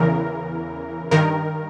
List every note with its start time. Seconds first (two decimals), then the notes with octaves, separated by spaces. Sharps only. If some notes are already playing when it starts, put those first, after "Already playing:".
Already playing: E2 C#3 E3 A#4
1.11 G2 D#3 A#4